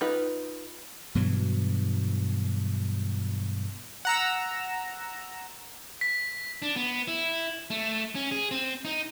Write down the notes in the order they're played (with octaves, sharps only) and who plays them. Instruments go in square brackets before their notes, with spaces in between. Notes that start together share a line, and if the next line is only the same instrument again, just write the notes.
[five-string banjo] D#4 F4 B4
[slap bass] G2 B2 E3 F#3
[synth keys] F#5 A#5 E6
[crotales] B6
[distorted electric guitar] D4
B3
E4
A3
C#4
G#4
C4
D#4